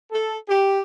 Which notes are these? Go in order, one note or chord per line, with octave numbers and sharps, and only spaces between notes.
A4
G4